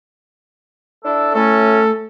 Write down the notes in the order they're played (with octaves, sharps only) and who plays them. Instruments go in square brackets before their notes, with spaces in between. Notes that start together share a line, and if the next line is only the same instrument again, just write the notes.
[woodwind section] D4 E4 A4
[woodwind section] A2 C#4 [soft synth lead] A3 [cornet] A4